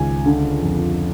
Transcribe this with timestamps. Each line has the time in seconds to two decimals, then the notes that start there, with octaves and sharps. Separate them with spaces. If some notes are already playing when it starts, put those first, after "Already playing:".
Already playing: C#2 D#3 G#3 G#5
0.25 D3
0.62 F2